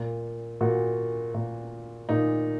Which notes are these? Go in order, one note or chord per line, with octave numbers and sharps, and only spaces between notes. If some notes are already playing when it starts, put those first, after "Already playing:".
Already playing: A#2
A#2 F#4
A#2
A#2 D#4